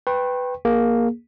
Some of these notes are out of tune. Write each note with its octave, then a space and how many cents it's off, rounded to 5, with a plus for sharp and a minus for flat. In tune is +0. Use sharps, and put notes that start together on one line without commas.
B4 +10 G5 +0 C#6 -40
A#3 +10 G#4 +0